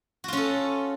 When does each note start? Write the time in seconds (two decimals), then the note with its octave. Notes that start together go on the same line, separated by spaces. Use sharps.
0.24 F#4
0.28 F4
0.33 C#4
0.37 A4